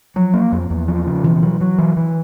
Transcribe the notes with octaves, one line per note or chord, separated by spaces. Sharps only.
F3 F#3
A#3
F2
E2
F3
C#3
B2 E3
F#3
F#3
E3
E3